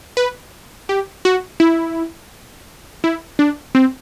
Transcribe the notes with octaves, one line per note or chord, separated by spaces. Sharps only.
B4
G4
F#4
E4
E4
D4
C4